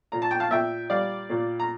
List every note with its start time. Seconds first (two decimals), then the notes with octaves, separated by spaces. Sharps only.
0.12 A#2 A#5
0.22 A5
0.31 G5
0.40 F5 A5
0.51 A#2 E5 G5
0.90 G3 D5 F5
1.30 A#2
1.60 A#5